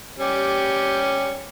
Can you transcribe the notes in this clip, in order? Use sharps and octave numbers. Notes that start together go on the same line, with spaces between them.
G3 C#4 G4